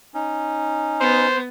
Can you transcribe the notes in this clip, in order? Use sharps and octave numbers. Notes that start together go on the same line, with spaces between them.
C#4 D#4
B3 C5